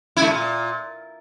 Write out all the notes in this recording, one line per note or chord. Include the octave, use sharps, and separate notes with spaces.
E4
A3
A#2